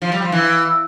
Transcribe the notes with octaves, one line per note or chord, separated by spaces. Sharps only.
F3
G3
F3
E3